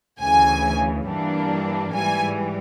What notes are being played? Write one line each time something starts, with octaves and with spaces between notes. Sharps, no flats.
D2 C#3 E3 G#5
G2 E3 G3 A#3 D4
G#2 E3 G3 G#5